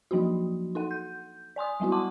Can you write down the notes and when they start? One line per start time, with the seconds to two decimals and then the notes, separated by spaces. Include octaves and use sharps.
0.11 F3 F#3 A#3 D4 D#4 F#4
0.75 D#4 A4 F#5
0.91 G6
1.56 D5 G#5 C6 D#6
1.80 F#3 G3 B3 E4 F#4
1.92 F#5 A5 C6 D6